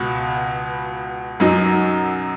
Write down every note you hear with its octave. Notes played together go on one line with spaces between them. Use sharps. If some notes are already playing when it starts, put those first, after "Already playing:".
Already playing: C#2 B2 B3
F#2 F#3 D#4